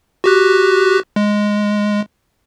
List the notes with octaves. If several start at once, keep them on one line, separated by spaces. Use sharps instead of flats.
F#4 G4 F#6
G#3